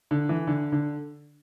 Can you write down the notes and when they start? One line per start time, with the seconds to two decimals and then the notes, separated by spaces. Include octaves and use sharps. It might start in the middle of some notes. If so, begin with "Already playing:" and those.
0.11 D3
0.29 E3
0.47 D3
0.72 D3